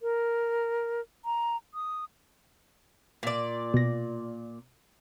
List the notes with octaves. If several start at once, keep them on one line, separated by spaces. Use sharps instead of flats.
A#4
A#5
D#6
A#2 D5
B2 A#6